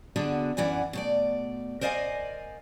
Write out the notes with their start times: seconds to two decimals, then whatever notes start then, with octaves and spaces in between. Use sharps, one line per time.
0.16 D3 B3 F#4 G#4 D5 A5
0.57 F#2 E3 D5 F#5 G#5
0.93 B2 A3 D5
1.81 A#4 C5 D5 D#5 F5 G#5